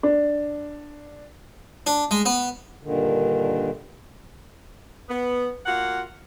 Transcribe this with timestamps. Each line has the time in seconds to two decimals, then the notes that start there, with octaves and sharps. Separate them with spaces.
0.03 D4
1.87 D4
2.11 G#3
2.26 B3
2.83 G2 A#2 D3 D#3
5.09 B3
5.66 A#3 F4 F#4 F#5